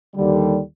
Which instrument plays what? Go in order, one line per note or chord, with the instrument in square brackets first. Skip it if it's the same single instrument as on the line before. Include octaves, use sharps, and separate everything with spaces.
[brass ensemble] D#2 D3 G3